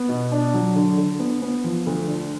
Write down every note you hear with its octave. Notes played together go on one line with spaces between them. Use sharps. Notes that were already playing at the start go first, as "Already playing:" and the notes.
Already playing: B3
B2
D4
F#3
D3
D3
B3
B3
F3
D2
D3